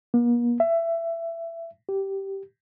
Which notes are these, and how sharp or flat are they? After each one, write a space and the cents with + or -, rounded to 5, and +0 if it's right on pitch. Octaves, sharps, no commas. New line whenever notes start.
A#3 +45
E5 +20
G4 -10